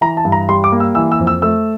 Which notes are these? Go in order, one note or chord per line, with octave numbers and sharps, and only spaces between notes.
E3 A#5
A5
G2
A#5
G3 C6
D6
A#3
E6
E3 E6
E6
F2
E6
A3 E6